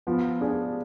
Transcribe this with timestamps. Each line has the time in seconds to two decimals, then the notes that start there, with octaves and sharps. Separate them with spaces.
0.07 F3 B3
0.41 D4 G#4